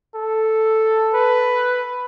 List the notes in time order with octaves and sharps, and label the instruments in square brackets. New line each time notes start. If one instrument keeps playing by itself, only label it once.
[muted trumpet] A4
[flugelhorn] B4